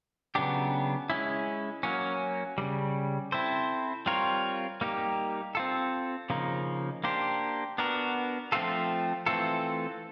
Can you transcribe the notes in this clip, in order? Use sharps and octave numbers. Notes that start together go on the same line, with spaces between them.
C#3 F#3 B3 D4 G4
G#3 C#4 E4
F#3 A#3 C#4
C#3 E3 G3
C4 E4 A4 C5
G3 C4 F4 A#4 C#5
G3 A#3 D#4 G4
C4 F4 A4
C#3 F3 A#3 D#4
A#3 D4 G4 C5
B3 D4 F#4 A#4
F3 A3 C4 F4 A4
E3 A3 C4 F4 A4